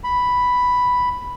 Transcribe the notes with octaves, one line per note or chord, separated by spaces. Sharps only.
B5